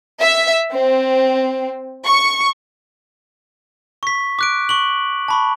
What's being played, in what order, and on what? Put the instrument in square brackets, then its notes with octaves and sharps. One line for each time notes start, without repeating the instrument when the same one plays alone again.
[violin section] E5
C4
C#6
[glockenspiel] C#6 B6
D6 F#6 D7
C#6 F#7
A5 B5 C#6